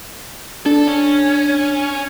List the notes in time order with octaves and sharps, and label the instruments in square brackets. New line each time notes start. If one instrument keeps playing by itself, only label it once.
[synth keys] D4 [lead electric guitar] A4
[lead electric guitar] C#4